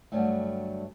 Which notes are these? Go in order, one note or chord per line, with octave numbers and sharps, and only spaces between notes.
G2 B2 D3 F#3 G3 A3